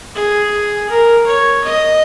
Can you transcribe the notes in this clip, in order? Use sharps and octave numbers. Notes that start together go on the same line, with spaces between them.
G#4
A#4
C#5
D#5